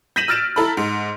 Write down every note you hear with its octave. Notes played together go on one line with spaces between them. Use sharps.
G6 A#6 B6 D#7 E7 F#7
E6 F6 A6 D7 E7
E4 A4 A#5 B5
G#2